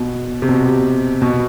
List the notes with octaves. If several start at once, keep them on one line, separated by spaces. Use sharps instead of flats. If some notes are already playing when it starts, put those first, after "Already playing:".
Already playing: B2
C3
B2
B2